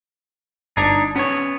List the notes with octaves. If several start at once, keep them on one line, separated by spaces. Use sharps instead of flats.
G1 D4 D#4 A#5 G#6
B3 C#4 C#5